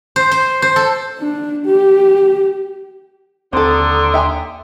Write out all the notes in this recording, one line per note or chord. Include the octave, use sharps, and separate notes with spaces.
C5
C5
C5
A4
D4
G4
D#2 D3 C4 A4 A#5 C6 D#6
E5 G5 G#5